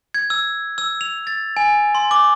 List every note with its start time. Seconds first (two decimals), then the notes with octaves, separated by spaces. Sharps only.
0.14 G#6
0.30 E6
0.78 E6
1.01 F7
1.27 A6
1.57 G#5
1.95 C6
2.11 D6